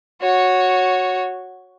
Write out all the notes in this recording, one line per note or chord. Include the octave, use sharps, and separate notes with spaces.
F#4 C#5